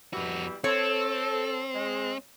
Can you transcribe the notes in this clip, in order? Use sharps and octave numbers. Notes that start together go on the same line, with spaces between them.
F2 B2 E3 G3 F#4
C4 A4 C#5
G#3